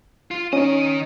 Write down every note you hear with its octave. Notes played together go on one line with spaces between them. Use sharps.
F4
D#3 C#4 D#4 D#5